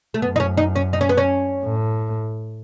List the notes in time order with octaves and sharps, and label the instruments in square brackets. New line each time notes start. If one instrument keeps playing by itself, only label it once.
[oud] A3
[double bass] F#2 [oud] B3
[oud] D#4
C#4
D#4
C#4
D#4
C#4
B3
C#4
[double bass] A2